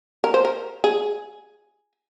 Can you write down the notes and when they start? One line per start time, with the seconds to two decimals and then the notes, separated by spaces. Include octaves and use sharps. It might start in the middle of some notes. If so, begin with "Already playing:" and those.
0.24 A#4
0.34 C5
0.45 A#4
0.84 G#4